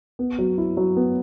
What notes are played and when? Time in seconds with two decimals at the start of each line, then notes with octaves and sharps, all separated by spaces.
0.19 B3
0.38 F#3
0.58 E4
0.77 F#3
0.97 B3